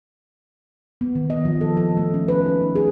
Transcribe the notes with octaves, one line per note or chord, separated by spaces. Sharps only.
B3
D#3
D#5
F3
A4
A4
A3
C#4
B4
D#4
A3
G#4